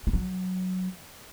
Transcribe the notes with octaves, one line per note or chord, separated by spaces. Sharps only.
A3
F#3